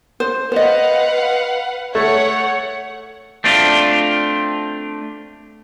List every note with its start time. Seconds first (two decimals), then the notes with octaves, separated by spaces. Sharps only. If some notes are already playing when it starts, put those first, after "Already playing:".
0.20 C5
0.52 B4 C5 D#5 F5 F#5
1.95 A3 C#5 F#5
3.44 A3 C4 D4 F4